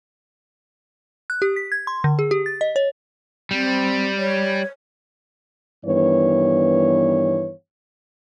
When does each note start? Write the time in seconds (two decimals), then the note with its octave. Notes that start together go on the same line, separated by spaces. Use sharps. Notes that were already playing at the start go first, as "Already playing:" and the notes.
1.30 F#6
1.42 G4
1.56 B6
1.72 G#6
1.87 C6
2.04 D3
2.19 G#4
2.31 G4
2.46 A6
2.61 D#5
2.76 C#5
3.51 G3 C4
4.18 C#5
5.85 G2 D#3 E3 B3 C#5